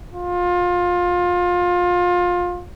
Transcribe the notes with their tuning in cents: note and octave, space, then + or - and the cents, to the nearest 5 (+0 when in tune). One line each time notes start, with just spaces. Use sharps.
F4 +25